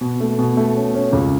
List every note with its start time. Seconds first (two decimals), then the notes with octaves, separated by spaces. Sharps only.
0.01 B2
0.20 A3
0.39 B2
0.57 A3
0.76 C#4
0.94 C#4
1.13 C#2